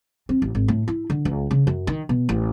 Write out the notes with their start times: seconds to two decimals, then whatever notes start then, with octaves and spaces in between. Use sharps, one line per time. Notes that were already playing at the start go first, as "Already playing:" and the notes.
0.29 C4
0.42 A1
0.55 G#1
0.68 A2
0.88 E4
1.10 D3
1.25 C#2
1.51 C#3
1.67 F#2
1.87 D#3
2.09 B2
2.29 A1